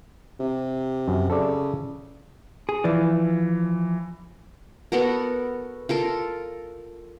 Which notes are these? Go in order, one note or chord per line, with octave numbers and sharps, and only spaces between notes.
C3
F#2
C#3 A4 D5
G#4
E3 F3 D5
B3 F#4 A4 A#4
F4 A4 A#4